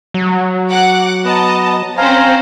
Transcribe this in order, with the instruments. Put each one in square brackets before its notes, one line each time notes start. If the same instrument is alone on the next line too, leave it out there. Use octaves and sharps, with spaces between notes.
[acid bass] F#3
[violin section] F#5 D6 F#6
[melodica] B3 [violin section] D#5 A5 A#5
[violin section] C4 C#4 C5 [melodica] F5 G#5 A#5